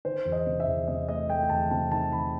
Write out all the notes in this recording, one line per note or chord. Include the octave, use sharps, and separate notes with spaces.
D#3 C5
E2
D#5
C3
E5
E2
C3 D#5
A3 D#5
A3 G5
G5
E2 A5
C3 A5
D#3 A5
D#3 B5